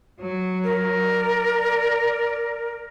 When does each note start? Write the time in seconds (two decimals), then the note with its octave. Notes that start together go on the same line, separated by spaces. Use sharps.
0.20 F#3
0.64 A#4
1.07 D5